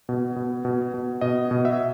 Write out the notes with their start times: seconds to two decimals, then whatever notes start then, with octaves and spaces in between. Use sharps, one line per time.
0.09 B2
0.36 B2
0.65 B2
0.94 B2
1.21 B2 D#5
1.51 B2
1.65 E5